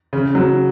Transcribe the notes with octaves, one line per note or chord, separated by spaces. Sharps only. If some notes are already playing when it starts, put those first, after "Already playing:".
C#3
F#3